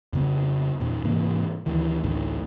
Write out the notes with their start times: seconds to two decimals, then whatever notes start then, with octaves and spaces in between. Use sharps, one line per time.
0.13 F2 C#3 B3
0.80 E2 A#2
1.04 G#2 C3 E3 A#3
1.66 D2 D#3 E3
2.03 A1 D2 A2 D3